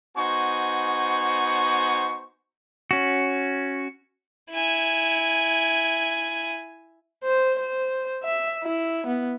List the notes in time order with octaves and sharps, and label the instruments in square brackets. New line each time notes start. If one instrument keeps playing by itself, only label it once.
[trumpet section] B3 D#4 F#4 C5 G#5 C#6
[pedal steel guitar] C#4 F#4
[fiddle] E4 G#5
[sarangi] C5
C5
E5
E4
B3